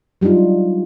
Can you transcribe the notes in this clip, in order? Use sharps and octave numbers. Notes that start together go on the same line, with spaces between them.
F#3 G3 D4 D#4 F4